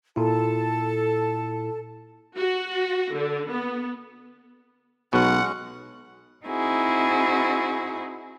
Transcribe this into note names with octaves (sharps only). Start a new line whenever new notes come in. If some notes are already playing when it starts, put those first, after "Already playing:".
A#2 E4 A4 A5
F#4
D3
B3
B1 B2 G#3 C#4 F#5 C#6
C4 D#4 E4 F#4 G#4